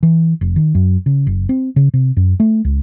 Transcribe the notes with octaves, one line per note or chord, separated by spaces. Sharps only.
E3
F1
D#3
F#2
C#3
F#1
C4
C#3
C3
F#2
A3
C#2